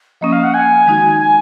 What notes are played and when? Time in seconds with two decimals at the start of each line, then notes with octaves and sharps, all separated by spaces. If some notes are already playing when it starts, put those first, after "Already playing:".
0.21 F3 A#3 C#4 D#5
0.32 F5
0.43 F#5
0.53 G#5
0.86 D#3 G#3 D#4 F#4
1.18 G#5